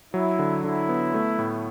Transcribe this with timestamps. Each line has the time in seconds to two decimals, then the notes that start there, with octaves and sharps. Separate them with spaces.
0.14 F#3 E4
0.39 D3
0.64 D3 E4
0.89 B3
1.14 A3
1.39 A2